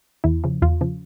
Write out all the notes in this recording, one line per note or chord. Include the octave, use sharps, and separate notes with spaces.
E2 E4
C#3 F3
E2 F4
C#3 F3